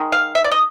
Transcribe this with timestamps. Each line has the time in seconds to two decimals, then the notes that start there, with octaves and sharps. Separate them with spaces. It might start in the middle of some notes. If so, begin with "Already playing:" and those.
Already playing: D#3 G#3
0.12 F5
0.35 E5
0.44 D5
0.51 D#5